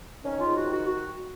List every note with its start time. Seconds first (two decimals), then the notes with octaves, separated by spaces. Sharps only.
0.24 D#3 C#4
0.40 F4
0.45 G#2
0.56 F#4
0.66 D#3
0.71 F#4
0.87 F#4